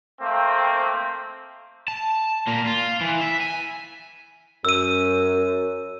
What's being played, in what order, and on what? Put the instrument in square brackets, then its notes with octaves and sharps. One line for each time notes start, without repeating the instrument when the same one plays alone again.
[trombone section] A3 A#3 C4
[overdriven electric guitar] A5
A#2 A#3
F4
E3
E5
G#5
[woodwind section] F#2 [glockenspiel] E6 D#7